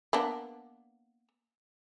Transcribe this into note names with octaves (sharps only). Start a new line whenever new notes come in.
A#3 B3 D4